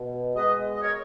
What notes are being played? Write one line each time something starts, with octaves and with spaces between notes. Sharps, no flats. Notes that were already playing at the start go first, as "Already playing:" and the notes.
Already playing: B2
G#3 B3 B4 D#5
D#5
A#4 C#5